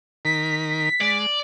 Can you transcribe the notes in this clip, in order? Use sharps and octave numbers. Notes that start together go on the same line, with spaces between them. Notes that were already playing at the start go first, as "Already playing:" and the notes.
D#3 A#4 B6
G#3 D5